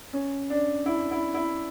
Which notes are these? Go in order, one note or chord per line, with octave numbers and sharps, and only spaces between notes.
C#4
D4
E4
E4
E4